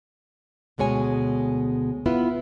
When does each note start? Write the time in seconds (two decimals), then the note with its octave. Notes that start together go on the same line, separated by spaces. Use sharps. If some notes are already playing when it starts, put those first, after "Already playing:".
0.78 D2 B2 G#3 C#5 G#5
2.06 B3 E4 F4